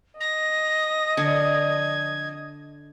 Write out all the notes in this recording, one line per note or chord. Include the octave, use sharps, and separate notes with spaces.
D#5 A#6
F2 D3 D5 G#6